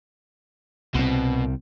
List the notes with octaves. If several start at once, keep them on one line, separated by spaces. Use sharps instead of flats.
C2 B2 C4